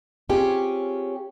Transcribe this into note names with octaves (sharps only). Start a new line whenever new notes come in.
C4 C#4 F4 G4 G#4 C#5